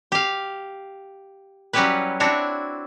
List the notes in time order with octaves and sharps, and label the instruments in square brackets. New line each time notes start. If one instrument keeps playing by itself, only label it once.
[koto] G4 F5
F#3 G3 C#4 E4 G4 B4
C4 D4 E4 F#4 C#5